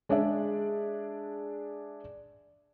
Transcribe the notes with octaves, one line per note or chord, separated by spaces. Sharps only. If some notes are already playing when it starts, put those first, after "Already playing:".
G#3 D4 G#4 D5 E5